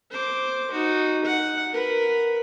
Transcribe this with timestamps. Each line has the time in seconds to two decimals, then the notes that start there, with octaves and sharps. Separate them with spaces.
0.11 C5 D6
0.71 D#4 F#4
1.25 F#5
1.72 A#4 B4